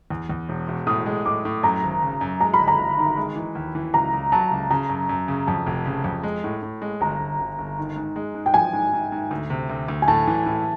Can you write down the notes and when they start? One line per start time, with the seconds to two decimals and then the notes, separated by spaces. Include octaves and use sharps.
0.10 E2
0.30 E2
0.49 E1
0.68 E1
0.87 A2 D#6
1.06 G#3
1.25 A2 D6
1.45 A2
1.63 F#2 A#5
1.83 G#1
2.02 C#3
2.21 F#2
2.40 G#3 A#5
2.54 B5
2.59 G1
2.68 A#5
2.79 G1
2.98 D#3
3.17 G#3
3.36 E3
3.55 D#2
3.75 E3
3.94 C#2 A#5
4.13 C#2
4.32 F#3 A5
4.51 C#2
4.71 C#3 A#5
4.89 F#2
5.09 F#2
5.28 C#3
5.47 F2 A5
5.66 F1
5.86 C#3
6.04 F2
6.23 G#3
6.44 A2
6.63 A2
6.82 G#3
7.00 G1 A#5
7.19 G1
7.39 G1
7.58 G1
7.78 D#3
7.96 G#2
8.16 G#3
8.35 G#2
8.46 G5
8.54 F3 G#5
8.73 G#2
8.93 G#2
9.12 G#2
9.31 D2
9.50 C3
9.69 D2
9.88 D2
10.02 G#5
10.08 A2 A5
10.27 E3
10.46 A2